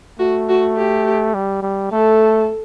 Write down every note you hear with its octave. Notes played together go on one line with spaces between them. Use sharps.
A3 F#4
F#4
G4
G3
G3
A3 A4